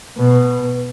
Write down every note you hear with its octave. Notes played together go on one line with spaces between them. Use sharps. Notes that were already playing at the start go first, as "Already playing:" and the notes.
B2